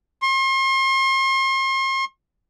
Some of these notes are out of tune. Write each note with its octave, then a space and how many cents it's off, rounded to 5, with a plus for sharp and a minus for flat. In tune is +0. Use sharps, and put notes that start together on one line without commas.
C6 +40